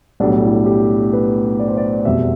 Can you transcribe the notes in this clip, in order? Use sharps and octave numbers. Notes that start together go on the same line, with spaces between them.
B1 A2 G3 D4
E4
G4
B4
D5
C5
D5
F1 E2 B2 G3 E5